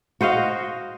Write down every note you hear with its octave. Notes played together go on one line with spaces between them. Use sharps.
F#4 C5 D#5 F5